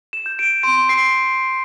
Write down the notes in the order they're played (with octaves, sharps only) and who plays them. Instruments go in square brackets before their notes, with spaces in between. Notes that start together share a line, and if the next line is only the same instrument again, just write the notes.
[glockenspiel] E7
G6
D7
C6 D7
C7